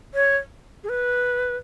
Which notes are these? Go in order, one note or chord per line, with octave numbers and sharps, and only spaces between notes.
C#5
G#4
B4